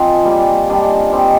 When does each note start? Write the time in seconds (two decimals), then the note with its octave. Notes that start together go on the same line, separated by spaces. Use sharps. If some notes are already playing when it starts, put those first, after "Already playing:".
Already playing: F3 C4 D#4 G#4
0.25 G3 A#3 F4 G#4
0.68 D#3 G3 D4 G#4
1.12 G3 C4 D#4 G#4